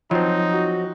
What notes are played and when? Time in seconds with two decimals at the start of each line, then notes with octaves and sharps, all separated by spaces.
0.11 F3 F#3 C4 D#4
0.51 F#4